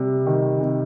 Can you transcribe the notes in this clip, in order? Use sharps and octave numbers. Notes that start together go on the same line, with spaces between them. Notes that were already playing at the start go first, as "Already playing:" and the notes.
Already playing: C3 G3
D#3
C3